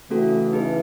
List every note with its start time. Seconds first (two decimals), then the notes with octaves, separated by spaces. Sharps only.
0.10 C#3 E3 A3 C#4 F#4 A4
0.53 D#4 G#4 B4